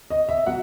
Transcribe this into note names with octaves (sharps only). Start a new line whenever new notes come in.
D#5
E5
B2 F#3 F#5